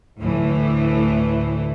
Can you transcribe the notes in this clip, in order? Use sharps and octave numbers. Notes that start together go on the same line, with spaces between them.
D2 A2 E3